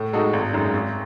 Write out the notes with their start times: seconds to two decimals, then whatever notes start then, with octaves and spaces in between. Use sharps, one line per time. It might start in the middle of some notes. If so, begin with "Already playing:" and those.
Already playing: A2
0.13 G#3 D#4 F#4 A4
0.33 G#1
0.53 F#2 D#3 G#3
0.73 G#1